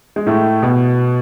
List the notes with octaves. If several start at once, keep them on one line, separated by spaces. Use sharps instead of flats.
G#3
A2 A3
B2 B3